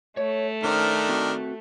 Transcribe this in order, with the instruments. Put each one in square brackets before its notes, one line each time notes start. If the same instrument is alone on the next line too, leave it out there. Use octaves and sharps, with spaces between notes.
[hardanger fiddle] A3 [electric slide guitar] C#5
[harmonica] D#3 D4 A#4 [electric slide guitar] C#4 C5 D5
[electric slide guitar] C4 F#4